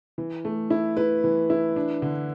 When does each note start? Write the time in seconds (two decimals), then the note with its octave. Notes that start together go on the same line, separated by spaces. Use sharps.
0.18 E3
0.45 A3
0.70 E4
0.97 E4 B4
1.24 E3
1.50 E4
1.76 D4
2.02 D3